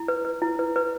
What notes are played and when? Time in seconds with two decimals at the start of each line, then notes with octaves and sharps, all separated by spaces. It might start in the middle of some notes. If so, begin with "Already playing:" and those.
Already playing: E4
0.08 B4
0.25 B4
0.42 E4
0.59 B4
0.76 B4